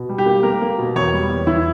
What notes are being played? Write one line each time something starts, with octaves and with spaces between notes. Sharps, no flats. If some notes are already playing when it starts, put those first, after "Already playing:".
Already playing: B2
G3
G4
A#3
A#3 A#4
A#3
B2
E2 C#5
G3
E2
E2 E4